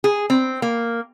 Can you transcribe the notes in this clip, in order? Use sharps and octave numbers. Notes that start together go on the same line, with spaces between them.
G#4
C4
A#3